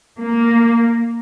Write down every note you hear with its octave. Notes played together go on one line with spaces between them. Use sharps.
A#3